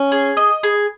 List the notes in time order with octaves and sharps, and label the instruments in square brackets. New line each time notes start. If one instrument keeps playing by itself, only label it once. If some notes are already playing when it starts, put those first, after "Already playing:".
Already playing: [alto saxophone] C#4
[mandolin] G#4
D#5
G#4